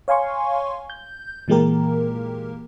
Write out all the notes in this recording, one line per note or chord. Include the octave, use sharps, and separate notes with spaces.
C#5 F5 G#5 C6 C#6
G6
A#2 E3 G#3 A#3 G4 A#4